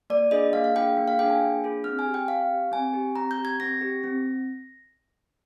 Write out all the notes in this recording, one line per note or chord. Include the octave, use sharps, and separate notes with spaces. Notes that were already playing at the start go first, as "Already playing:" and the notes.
A#3 D5
D4 F4 G#4 D#5
A#3 F5
F5
D4 F4 G#4 G5
A#3
F5
D4 F4 G#4 G5
G#5
A#3
D4 F4 G#4
C4 F6
G#5
G4
G5
C4 F5
G4
C4 G#5
G4
C4 A#5
G6
G4
G#6
C4 A#6
G4
C4